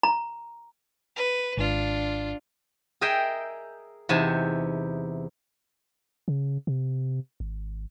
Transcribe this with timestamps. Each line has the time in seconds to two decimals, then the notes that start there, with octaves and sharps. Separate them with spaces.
0.03 A#5
1.16 B4
1.57 G#1 D4 F4
3.01 G#4 A#4 D#5 E5 G5
4.09 E2 C3 D#4 G#5 A5
6.28 C#3
6.67 C3
7.40 G#1